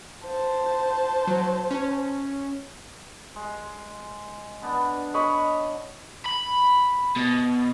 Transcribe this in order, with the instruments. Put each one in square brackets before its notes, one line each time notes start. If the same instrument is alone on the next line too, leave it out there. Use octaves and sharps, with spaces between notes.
[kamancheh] C5 A5
[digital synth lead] F#3
C#4
[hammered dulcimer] G#3
D3 B3 D4
[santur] C#5 D#5 B5
[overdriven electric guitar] B5
B2